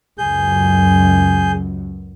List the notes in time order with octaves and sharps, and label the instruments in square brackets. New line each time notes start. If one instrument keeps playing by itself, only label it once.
[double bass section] C#2 F#2 [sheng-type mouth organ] G#4 G6